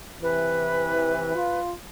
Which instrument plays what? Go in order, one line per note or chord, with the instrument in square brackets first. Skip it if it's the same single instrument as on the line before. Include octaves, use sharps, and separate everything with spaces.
[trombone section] C3 E3 [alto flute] B4
[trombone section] F4